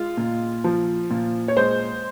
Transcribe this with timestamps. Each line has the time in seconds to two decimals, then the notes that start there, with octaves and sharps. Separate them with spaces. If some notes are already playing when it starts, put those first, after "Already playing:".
Already playing: G#3 F4
0.17 A#2
0.64 F3
1.10 A#2
1.48 C#5
1.57 G#3 C5